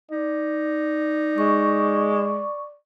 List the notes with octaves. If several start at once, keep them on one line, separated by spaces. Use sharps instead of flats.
D#4 D5
G#3 C#6